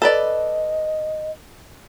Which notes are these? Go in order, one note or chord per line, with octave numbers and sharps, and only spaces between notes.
A4 B4 D5 D#5